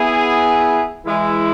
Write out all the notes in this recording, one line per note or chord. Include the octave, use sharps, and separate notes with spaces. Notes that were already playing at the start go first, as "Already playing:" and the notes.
Already playing: B3 E4 G#4
E3 G#3 E4